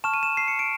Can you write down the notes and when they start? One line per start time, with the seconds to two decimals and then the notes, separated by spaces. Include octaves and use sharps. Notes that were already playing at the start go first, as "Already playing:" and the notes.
0.04 A5 C#6 F6 E7
0.14 D#7
0.23 E7
0.37 C7
0.48 C#7
0.59 D7